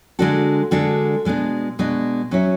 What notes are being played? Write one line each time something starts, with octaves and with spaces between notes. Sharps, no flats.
D3 G#3 D4 F#4 A4
D3 G#3 D4 F#4 A4
B2 G#3 B3 D4
B2 G#3 B3 D4
F#3 C#4 F#4 C#5 E5